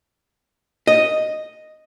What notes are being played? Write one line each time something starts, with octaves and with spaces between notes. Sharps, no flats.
D#5